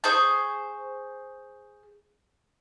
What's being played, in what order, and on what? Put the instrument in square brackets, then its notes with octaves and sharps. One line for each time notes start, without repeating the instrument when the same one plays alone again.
[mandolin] G#4 C5 C#6 G6